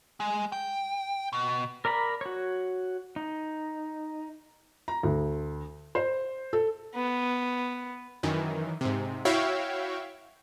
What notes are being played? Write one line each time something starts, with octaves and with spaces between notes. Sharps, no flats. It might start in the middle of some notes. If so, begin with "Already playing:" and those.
G#3
G5
B2
A#4 D5 A#5 B5
F#4 C#5
D#4
A#5
D2
C5
A4
B3
F#2 D#3 E3
G#2 C3
E4 F#4 C#5 E5 F5 G5